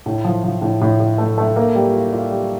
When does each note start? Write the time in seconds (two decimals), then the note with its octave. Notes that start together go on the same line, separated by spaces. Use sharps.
0.06 A2
0.24 F3
0.44 F3
0.62 A2
0.81 A2
1.00 A2
1.18 A3
1.38 A3
1.56 A#3
1.75 G3
1.93 F4
2.12 F4
2.31 G3